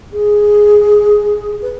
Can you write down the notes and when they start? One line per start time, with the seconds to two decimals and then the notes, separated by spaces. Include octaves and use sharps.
0.13 G#4
1.62 B4